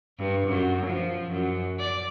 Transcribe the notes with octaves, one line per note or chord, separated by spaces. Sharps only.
G2
F#2
F3
F#2
D5